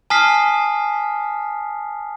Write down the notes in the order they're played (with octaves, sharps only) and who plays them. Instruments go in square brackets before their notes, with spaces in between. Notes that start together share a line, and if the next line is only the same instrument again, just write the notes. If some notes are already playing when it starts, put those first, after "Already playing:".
[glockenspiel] G#5 A5 D#6 F6 B6 C7